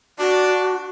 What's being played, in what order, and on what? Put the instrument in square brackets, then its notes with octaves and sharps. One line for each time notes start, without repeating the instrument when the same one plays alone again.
[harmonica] D4 [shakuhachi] F#4